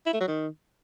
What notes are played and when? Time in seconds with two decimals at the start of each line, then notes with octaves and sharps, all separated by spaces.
0.06 E4
0.13 A3
0.20 F#3
0.28 D#3